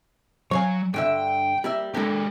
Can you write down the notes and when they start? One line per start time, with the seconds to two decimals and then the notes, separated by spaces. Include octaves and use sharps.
0.51 F#3 C#5 F5 G#5
0.94 G2 D3 E5 G5
1.64 G3 A#3 E5
1.94 G#3 A#3 D4 G4 A4